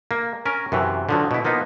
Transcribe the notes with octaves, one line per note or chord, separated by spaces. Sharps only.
A#3
C#4 A#4
F#2 C3 E3
D3 F3 F#3
B2 E4
F3 A#3 B3 D#4